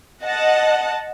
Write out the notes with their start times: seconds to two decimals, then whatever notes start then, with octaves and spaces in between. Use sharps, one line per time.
0.24 D#5 F#5 A5